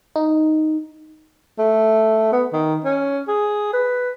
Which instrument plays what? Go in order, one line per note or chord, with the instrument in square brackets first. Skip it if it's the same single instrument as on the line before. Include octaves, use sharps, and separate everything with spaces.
[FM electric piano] D#4
[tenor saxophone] A3
B3
D#3
C#4
G#4
B4